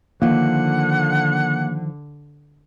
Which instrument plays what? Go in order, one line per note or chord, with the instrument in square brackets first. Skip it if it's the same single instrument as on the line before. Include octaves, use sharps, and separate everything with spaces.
[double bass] D3 [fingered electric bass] D#3 F3 [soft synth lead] A#3 [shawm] F#5